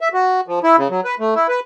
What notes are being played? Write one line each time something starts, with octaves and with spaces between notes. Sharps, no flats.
E5
F#4
F3
E4
C#3
F#3
B4
A3
E4
B4